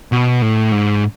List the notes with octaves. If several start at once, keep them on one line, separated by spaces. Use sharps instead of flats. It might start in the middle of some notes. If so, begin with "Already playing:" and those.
B2
A2
G#2